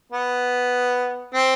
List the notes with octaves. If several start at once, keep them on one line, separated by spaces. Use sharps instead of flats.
B3
C4